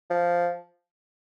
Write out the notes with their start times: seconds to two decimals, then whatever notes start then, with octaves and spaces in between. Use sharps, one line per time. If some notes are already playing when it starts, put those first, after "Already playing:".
0.10 F3